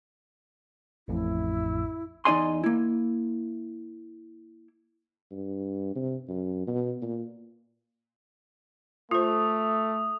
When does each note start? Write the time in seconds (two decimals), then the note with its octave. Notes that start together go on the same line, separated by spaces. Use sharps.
1.08 A1 F2 A2 E4
2.25 E2 D#4 D5 D#5 G#5 C6
2.64 A#3 E4
5.31 G2
5.95 C3
6.28 F#2
6.67 B2
7.02 A#2
9.11 A3 F4 C5 D#6